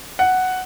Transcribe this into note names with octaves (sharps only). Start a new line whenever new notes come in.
F#5